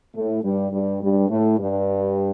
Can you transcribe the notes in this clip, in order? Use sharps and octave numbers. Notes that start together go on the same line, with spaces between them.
A2 A3
G2 G3
G2 G3
G2 G3
A2 A3
G2 G3